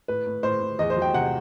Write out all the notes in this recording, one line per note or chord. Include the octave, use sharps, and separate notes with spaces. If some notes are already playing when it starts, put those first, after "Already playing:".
A2 B4
A2
A2 C5
A2
E2 D#5
C5
F#3
G5
C3 F#5